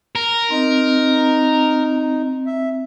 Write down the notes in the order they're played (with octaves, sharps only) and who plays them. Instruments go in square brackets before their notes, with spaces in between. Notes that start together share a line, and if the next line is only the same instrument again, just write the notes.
[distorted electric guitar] A#4
[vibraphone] C4 [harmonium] D#4
[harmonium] E5